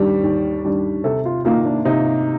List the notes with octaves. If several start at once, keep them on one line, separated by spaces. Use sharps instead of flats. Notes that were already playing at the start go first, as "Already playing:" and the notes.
Already playing: D#2 D#3 G3 D4 D5
D#2
D#3 G3 D4
C3 A4
F4
D#3 A#3 D#4 F4
D4
C3 D#4